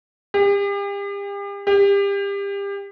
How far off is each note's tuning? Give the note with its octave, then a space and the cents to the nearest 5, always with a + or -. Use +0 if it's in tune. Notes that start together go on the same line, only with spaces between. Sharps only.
G4 +40
G4 +30